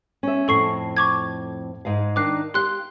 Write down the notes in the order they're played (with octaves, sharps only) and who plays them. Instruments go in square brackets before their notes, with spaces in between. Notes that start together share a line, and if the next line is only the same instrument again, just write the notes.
[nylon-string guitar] C#4 E5
[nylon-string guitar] F2 A2 [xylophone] A4 C#6 C7
[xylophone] C#6 D6 G#6
[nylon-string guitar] G#2 G#3 F5
[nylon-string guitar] D#3 D4 D#4 [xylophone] D6 F#6 C7
[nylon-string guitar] G4 F5 [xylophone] C6 F#6 G7